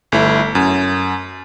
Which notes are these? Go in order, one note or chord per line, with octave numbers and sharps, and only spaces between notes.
G1 A3 E4
F#2